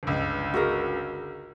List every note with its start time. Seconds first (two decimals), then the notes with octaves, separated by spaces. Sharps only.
0.03 G1 C#2
0.54 F#4 G#4 A#4